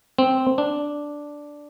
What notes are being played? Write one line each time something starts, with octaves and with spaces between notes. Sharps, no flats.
C4
D4